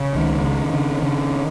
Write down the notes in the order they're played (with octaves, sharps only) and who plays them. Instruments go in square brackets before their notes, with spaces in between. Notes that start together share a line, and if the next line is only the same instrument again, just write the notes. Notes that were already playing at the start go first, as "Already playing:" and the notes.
Already playing: [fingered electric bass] C#3
C#2 D#3
C#3
C#3
C#3